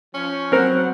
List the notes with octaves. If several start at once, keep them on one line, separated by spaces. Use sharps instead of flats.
F3 C#4
F#3 B3 C4 A#4 C5 F#5